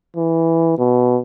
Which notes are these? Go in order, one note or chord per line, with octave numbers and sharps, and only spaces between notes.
E3
B2